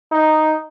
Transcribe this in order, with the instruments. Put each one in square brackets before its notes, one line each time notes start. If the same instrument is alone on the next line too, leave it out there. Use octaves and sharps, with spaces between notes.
[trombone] D#4